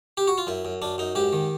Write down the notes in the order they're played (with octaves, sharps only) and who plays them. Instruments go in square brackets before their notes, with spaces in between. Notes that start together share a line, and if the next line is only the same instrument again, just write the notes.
[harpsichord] G4
F#4
F4
F#2 E4
F#2
F#2 D4
F#2 D#4
G#2 G4
D#3